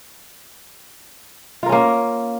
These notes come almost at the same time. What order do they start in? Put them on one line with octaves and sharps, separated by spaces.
F4 A#4 C#4 A#3